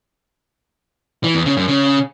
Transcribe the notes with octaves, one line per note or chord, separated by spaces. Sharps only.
E3
E2
C#3
F#2
C#3